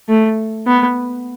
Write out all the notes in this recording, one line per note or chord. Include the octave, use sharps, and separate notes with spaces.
A3
B3